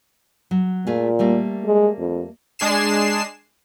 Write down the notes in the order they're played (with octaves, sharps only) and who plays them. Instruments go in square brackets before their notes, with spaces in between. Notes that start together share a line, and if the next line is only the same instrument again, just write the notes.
[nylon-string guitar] F#3
[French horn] A#2 [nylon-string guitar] A3 F4 G#4
[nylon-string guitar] G3 A3 A#3
[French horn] G#3
F2
[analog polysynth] G#3 D4 G#4 G#5 C7 E7